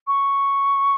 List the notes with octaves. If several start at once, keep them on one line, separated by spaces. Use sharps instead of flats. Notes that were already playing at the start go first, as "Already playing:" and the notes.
C#6